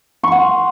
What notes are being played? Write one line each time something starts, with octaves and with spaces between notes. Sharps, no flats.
F#5 C6 C#6